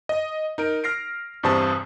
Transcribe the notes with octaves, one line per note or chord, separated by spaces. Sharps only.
D#5
D#4 A#4 D7
F6 A#6 C7 D7
E2 G2 C3 C5 A5 D#6